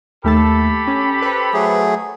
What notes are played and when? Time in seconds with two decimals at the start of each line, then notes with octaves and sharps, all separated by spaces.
0.24 D#2 A3 G4 A4 A5 B5
0.87 C#4
1.22 B4 C5
1.54 F#3 A3 G#4